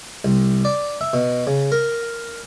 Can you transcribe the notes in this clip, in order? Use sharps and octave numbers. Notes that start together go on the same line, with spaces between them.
C2
D5
E5
B2
C#3
A#4